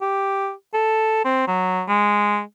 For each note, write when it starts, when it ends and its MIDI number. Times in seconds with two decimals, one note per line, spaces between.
0.02 0.52 67
0.74 1.20 69
1.25 1.44 60
1.48 1.83 54
1.88 2.41 56